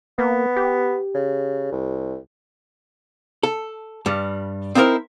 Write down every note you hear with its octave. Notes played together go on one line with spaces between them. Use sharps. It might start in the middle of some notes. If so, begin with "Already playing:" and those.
A#3 B3
G4
C#3
C2
A4
G2 G3
C4 D#4 E4 A4 A#4 C5